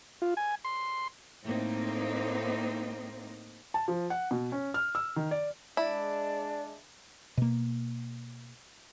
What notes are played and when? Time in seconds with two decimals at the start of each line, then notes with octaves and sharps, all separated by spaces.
0.22 F4
0.37 G#5
0.65 C6
1.43 A2 A#3 C4 D#4
3.74 A5
3.88 F3
4.10 F#5
4.31 B2
4.52 C#4
4.74 F6
4.95 E6
5.16 D#3
5.31 D5
5.77 G#3 D4 E4 D5
7.37 B2 A#3